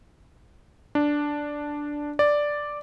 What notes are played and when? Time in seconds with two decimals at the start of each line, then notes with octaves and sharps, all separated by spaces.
0.95 D4
2.19 D5